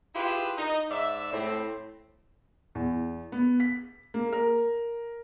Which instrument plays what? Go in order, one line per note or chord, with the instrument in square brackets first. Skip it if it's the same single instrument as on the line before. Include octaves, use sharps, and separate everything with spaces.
[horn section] E4 F4 G4 G#4 B4
D#4
G#2 D5 E5
A2 C4
[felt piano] E2
B3
B6
A#3
A#4